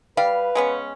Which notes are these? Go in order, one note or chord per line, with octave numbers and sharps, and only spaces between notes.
G3 B4 F5
G#3 B3 C#4